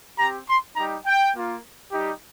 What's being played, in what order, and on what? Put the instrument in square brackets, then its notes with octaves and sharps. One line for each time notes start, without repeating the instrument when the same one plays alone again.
[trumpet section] C4 G4 A#5
C6
G3 D#4 G4 A#5
G5
A#3 F4
G3 D#4 G4